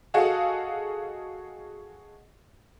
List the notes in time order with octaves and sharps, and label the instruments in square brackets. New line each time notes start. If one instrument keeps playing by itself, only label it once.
[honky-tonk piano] F#4 G#4 A4 D#5 F5 F#5